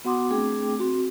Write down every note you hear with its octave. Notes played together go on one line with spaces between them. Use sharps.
B3 F#4 F#5 C6 D6 D#6
A3 C4 D4 G#4 G5 D6
C4 F#4